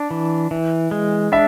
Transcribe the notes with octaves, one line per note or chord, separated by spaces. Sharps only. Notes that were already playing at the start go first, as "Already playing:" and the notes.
Already playing: D4
E3
E3
G#3
D4 E5